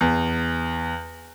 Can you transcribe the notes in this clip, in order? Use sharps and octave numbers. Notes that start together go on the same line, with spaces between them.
E2